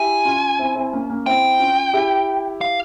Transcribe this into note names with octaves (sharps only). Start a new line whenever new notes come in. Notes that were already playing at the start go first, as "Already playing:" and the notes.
Already playing: E4 G4 G#5
C#4 F4
C4 E4
C4 E4
A#3 C#4
A#3 C#4
C4 E4 G5
C#4 F4
E4 G4
F5